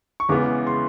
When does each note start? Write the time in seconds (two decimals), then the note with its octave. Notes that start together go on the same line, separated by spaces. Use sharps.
0.20 C#6
0.29 E2 C#3 E3 G#3 B3 D6
0.67 C6